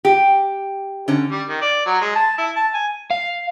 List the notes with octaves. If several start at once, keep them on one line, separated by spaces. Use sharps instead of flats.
G4
D3 C#4
G3
D#3
D5
F#3
G#3
A5
E4
A5
G#5
F5